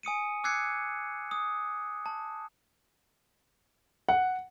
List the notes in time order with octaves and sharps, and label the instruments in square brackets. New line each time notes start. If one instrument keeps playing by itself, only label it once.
[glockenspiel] G#5 D#6 C#7 D#7
D6 E6 F#6 G#6 C7 C#7
D#6
A5
[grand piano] F#5